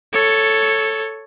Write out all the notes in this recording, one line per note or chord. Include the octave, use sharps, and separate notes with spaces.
A4 C#5